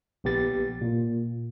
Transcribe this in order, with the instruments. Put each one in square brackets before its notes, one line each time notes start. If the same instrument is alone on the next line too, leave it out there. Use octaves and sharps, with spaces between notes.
[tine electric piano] A#1 B3 G4 A6
A#2